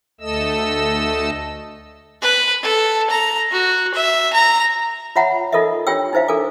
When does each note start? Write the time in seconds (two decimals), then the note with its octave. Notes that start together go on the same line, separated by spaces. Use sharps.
0.21 D2 A3 A4 D#5 E6
2.22 B4
2.62 A4
3.10 A#5
3.51 F#4
3.94 E5
4.33 A#5
5.16 F4 C#5 E5 F#5 A#5 B5
5.52 D#4 F4 A4 A#4 D#5 E5
5.87 D4 F4 G4 C#5 G5 E6
6.13 D#4 E4 C5 E5 F5
6.28 D4 A4 A#4 G#5 D6